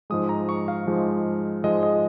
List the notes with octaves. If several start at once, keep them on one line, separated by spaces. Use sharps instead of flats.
G#2 F3 G#3 D#6
A#5
C#6
F5
G#2 F3 G#3
G#2 F3 G#3 D#5
D#5